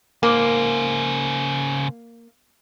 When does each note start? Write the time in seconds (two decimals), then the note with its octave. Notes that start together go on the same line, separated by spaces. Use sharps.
0.23 C#3 A#3 C5